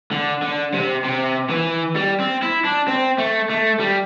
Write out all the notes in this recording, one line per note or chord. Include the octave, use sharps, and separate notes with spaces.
D3
D3
C3
C3
E3
G3
C4
E4
D4
C4
A3
A3
G3